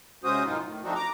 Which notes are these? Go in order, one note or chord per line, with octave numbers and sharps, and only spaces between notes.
C3 G#3 C#4 F#4 C5 D#6
F#2 A2 D#3 D#4 F4
A2 D#3
F3 A3 C4 D4 D#4 F#4
A#5 D6